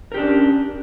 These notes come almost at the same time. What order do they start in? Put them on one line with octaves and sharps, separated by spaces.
A#4 G4 D4 C#4